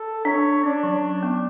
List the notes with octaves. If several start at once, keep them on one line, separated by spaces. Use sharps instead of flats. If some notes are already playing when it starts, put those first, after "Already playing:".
Already playing: A4
D4 C#5
C#4 D4
F#3
B3